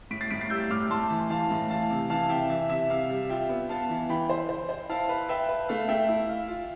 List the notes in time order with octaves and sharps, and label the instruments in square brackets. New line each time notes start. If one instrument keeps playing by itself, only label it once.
[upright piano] A2 [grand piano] B6 D7
[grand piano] A6 C7
[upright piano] A2 [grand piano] B6 D7
[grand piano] A6 C7
[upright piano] G3 [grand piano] E6 G6
[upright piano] A2 [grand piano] D6 F6
[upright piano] A2 [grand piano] A5 C6
[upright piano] E3
[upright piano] E3 [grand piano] F5 A5
[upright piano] A2
[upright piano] E3 [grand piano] F5 A5
[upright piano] C3
[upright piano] E3 [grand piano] F5 A5
[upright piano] C3 [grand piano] E5 G5
[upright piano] E3 [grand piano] E5
[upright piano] C3 [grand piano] E5
[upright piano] C3 [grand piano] F5
[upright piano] G3
[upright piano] F4 [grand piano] E5 G5
[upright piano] B3
[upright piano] B3 [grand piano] F5 A5
[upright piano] E3
[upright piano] E3 [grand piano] G5 B5
[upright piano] C5
C5
C5
[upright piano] E4 [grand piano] F5 A5
[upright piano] B4
[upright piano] B4 [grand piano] E5 G5
[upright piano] B4
[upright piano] A3 [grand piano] F5
[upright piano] A3 [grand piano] E5 G5
[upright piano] E4
F5
F4